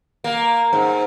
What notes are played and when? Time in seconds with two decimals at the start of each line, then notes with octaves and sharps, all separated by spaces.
0.24 A#3
0.73 G#2